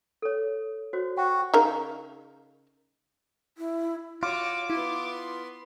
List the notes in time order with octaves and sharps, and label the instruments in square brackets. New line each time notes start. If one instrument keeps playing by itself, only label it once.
[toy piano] A4 C#5
F#4 C5 C#5
[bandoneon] F#4 [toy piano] G5
[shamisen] C#3 D#4 A#4
[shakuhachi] E4
[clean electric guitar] F4 [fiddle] F#4 C#5 [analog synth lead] D6
[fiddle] B3 C6 [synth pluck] E4